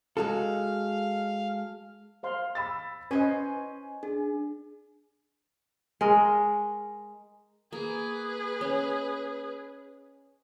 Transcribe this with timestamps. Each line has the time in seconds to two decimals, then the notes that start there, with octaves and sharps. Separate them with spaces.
0.17 G#3 F#4 A4 F5
2.23 C5 F5 C6
2.55 B5 E6 A6
3.11 C#4 B4 C5 D#5 G#5
4.03 D4 G#4
6.01 G#3 A#4
7.72 A#3 G#4 B4
8.61 C#4 D#5